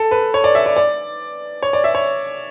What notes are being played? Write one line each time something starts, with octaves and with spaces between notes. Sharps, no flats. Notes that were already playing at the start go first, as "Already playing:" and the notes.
Already playing: A4
B4
C#5
D5
E5
D5
D5
C#5
D5
E5
C#5